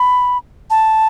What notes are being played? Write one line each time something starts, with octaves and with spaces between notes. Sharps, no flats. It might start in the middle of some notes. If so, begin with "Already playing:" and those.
Already playing: B5
A5